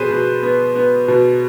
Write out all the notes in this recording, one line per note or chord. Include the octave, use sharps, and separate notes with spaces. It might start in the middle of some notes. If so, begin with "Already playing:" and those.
Already playing: B2 B3 G#4 B4 C5
B2
B3
B3
B2